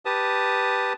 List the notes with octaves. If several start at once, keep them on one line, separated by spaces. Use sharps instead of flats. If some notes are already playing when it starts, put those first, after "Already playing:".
G4 B4 A5 D#6